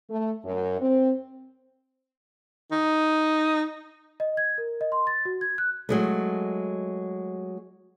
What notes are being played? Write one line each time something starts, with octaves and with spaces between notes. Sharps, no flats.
A3
F#2
C4
D#4
D#5
G#6
A#4
D#5
C6
A6
F#4
G#6
F#6
F#3 G#3 A3